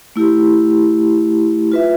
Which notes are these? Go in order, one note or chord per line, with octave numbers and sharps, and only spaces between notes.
A3 E4 G4
F4 B4 E5